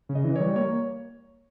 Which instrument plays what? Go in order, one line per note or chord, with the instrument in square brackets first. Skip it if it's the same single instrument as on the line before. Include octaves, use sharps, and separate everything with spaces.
[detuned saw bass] C#3
[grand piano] D#5
[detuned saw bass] E3
[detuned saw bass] G3 [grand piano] C#5
[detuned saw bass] A#3 [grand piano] C#5